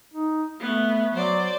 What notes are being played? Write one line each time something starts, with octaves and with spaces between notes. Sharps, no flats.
D#4
A3 B3
F#3 C5 D5